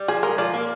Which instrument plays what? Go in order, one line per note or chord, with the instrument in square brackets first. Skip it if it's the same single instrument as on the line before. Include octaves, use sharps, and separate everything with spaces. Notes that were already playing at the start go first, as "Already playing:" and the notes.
Already playing: [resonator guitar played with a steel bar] G3
[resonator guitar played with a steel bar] F3 [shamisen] G#4
[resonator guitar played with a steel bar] G#3 [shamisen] A#4
[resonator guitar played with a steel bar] F3 [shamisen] D5
[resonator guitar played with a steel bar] A#3